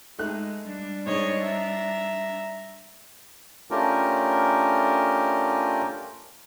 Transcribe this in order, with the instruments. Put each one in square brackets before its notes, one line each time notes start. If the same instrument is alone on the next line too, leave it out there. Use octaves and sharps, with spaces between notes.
[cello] G#3 [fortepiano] A3 D#4 F#6
[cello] G3 D4
[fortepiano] G#2 [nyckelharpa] C#5 D#5
[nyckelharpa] E5 A#5
[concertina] A3 C#4 D4 F4 G4 A#4